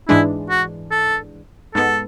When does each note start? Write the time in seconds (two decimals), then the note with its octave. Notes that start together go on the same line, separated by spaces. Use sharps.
0.08 G#2 E3 G#3 D4 E4
0.50 F#4
0.91 A4
1.75 G#2 G#3 B3 A4